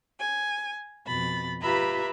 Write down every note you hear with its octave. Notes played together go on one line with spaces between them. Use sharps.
G#5
F2 B2 B5 A6
F4 G4 B4 E5 A#5 B5